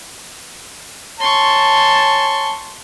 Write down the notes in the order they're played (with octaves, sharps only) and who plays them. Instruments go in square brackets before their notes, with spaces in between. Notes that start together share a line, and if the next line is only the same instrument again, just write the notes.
[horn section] C#5 G#5 A5 [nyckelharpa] C6 C#6